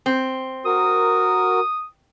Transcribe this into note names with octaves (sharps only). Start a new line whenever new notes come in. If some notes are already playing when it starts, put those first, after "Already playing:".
C4
F#4 A#4 D#6